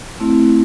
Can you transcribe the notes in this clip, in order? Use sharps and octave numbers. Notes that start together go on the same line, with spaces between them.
A3 C4 E4